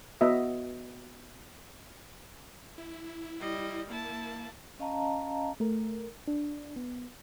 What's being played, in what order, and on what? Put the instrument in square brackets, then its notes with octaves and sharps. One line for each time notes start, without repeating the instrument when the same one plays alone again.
[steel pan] B3 F#4 D#5 E5
[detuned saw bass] E4
[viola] G3 D#5
[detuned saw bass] A#3 [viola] E4 A5
[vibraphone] C#4 D#5 F5 A5 A#5
[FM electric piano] A3 A#4
D4
B3